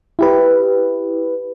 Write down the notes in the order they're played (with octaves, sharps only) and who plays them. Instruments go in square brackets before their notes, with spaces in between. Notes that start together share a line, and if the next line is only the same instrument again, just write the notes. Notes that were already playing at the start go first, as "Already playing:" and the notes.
[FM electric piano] E4 G4 B4